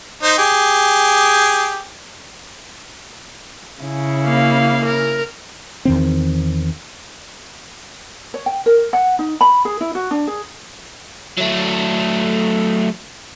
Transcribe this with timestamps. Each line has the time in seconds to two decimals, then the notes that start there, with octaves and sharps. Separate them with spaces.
0.23 D#4 C5
0.38 G4 G#4
3.81 C#3 E4
4.25 A#3 F5
4.85 A#4
5.85 E2 D#3 C4
8.34 C#5
8.46 G5
8.66 A#4
8.93 F#5
9.19 D#4
9.41 B5
9.65 G#4
9.81 E4
9.95 F#4
10.11 D4
10.27 G#4
11.38 F#3 A3